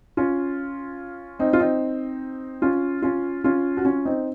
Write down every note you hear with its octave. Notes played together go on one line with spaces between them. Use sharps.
C#4 F4
C4 D#4
F4
C4 D#4
C#4 F4
C#4 F4
C#4 F4
F#4
C#4 F4
C4 D#4